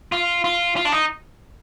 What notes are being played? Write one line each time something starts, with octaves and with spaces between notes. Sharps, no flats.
F4
F4
F4
D4
D#4